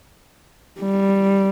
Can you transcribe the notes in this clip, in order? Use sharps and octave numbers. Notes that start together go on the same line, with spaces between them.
G3